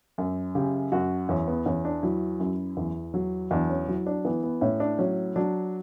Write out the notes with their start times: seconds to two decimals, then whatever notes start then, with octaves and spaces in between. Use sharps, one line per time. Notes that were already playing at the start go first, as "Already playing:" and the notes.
0.18 F#2
0.55 C#3 G4
0.92 F#2 F#4
1.29 E2 C#4
1.47 B3
1.66 E2 C#4
1.85 D4
2.03 F#3 E4
2.40 F#2
2.77 E2
3.14 F#3
3.51 E2 D4
3.69 C#4
3.88 F#3 E4
4.06 D4
4.25 E3 B3
4.43 B3
4.61 A2 C#4
4.80 D4
4.98 F#3 C#4
5.36 F#3 D4